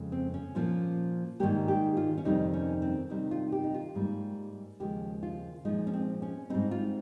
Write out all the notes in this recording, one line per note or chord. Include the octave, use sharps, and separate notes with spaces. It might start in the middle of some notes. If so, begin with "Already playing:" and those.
Already playing: F2 C#3 G#3
C4
C#4
A#2 F3 A#3
G#2 D#3 G3 A#3 G4
G4
F4
C#4
F2 C3 D#3 G3 C4 D#4
C#4
C4
C3 D#3 G3 D#4
F4
G4
D#4
F4
G#2 G3 A#3
D#2 C#3 F3 G#3 G4
F4
A#2 F3 G#3 D#4
C#4
C4
C#4
G#2 G3 C4 D#4
F4